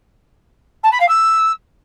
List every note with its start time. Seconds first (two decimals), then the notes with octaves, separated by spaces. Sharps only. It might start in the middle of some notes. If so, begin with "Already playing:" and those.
0.83 A5
0.92 B5
1.00 F5
1.08 E6